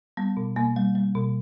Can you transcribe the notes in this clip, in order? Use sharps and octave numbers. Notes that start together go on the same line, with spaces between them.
G3 B3
B2
B2 A#3
G3
G3
B2